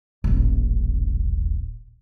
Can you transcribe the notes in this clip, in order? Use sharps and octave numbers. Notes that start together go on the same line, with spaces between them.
D#1 A1